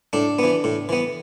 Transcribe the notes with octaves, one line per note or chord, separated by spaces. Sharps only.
A2 D4
E3 B3
A2
E3 B3